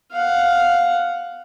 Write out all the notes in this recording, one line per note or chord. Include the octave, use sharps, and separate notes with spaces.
F5 F#5